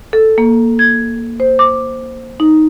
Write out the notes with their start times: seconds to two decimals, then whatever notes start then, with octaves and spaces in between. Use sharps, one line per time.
0.13 A4
0.38 A#3
0.79 G#6
1.40 C5
1.59 D6
2.40 D#4